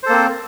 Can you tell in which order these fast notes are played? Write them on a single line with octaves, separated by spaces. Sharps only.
C5 A4 A#3 C4